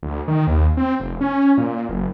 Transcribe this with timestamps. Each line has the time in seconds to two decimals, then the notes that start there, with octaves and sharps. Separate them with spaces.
0.03 D2
0.28 D#3
0.47 D#2
0.77 C4
1.00 F1
1.21 C#4
1.58 A#2
1.89 F#1